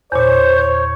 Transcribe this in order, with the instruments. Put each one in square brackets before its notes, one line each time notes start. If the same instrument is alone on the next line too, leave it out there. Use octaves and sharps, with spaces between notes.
[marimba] E2 A#2 [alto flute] C5 [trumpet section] C#5